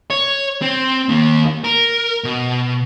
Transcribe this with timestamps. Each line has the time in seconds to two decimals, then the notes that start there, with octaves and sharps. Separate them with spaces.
0.10 C#5
0.62 C4
1.09 D#2 A#3
1.64 A#4
2.24 B2